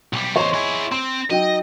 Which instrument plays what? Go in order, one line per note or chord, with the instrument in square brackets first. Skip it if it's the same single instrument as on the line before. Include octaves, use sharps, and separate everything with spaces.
[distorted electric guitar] B1 G3
[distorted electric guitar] E2 C5 [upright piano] C#5 D#5 C6
[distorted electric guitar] E4 G#4
[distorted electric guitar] C4 [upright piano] C6
[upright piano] F#3 D#4 G5 [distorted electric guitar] D#5